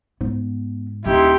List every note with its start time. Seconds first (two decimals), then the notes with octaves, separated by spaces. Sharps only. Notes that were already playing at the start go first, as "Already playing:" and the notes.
0.21 G#2 B3
1.06 D#1 D#4 E4 G4 C6